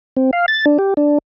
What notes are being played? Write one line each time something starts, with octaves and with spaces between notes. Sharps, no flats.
C4
F5
A6
D4
G4
D4